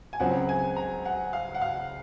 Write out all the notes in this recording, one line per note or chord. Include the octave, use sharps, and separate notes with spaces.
G#5
C#2 C#3 F#3 C4 F#5
G#5
A#5
F#5
F5
F#5
F5